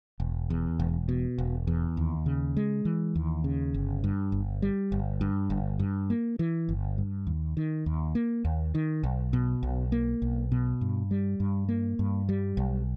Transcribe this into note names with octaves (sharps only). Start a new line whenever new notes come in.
E1
E2
E1
B2
E1
E2
D#2
C#3
G#3
E3
D#2
C#3
G1
G2
G1
G3
G1
G2
G1
G2
A#3
E3
G1
G2
D#2
D#3
D#2
A#3
D#2
D#3
B1
B2
B1
A#3
B1
B2
G2
G3
G2
A#3
G2
G3
B1